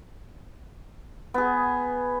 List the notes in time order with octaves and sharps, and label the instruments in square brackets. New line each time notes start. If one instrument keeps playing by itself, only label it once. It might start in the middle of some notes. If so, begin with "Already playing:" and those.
[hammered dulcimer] B3 G#4